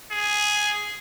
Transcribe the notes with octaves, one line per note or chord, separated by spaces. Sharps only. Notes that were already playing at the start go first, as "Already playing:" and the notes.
G#4